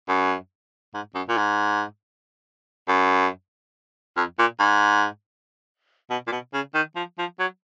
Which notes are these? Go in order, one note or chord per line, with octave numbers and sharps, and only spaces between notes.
F#2
G#2
F#2
A#2
G#2
F#2
F2
A#2
G#2
B2
A#2
B2
C#3
D#3
F3
F3
F#3